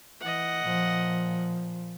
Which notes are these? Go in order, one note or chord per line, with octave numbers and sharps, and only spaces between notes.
E3 D#5 F#5
A#2 F3